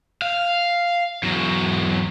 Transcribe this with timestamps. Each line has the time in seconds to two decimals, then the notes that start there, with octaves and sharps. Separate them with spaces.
0.22 F5
1.23 E2 F#3